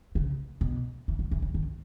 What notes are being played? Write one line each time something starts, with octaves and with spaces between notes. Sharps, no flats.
C#3
B2
E3
F#3
E3
F#3
D#3